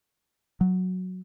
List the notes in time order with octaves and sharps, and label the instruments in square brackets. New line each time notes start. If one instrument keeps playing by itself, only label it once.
[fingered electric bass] F#3